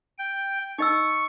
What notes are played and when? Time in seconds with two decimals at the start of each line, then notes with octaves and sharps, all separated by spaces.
0.18 G5
0.78 D#4 D#5 C#6 E6